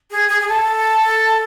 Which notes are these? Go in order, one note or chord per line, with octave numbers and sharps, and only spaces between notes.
G#4
G#4
G#4
A4